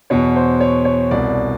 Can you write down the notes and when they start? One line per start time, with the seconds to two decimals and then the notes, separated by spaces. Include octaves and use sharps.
0.10 E2 B2 C#5
0.36 C5
0.61 C#5
0.85 C#5
1.11 C2 B2 D5